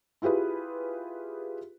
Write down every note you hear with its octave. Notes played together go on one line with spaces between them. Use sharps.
E4 F4 G4 G#4 B4